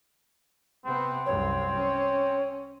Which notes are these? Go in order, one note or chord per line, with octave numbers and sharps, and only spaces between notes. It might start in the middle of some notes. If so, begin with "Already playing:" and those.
C3 B3 C4
C2 F#2 C#5
C#4